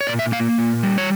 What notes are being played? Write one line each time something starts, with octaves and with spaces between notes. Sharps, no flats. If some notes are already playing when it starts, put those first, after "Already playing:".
C#5
A#2 D5
E5
A#3 F5
A#2
G3
C#5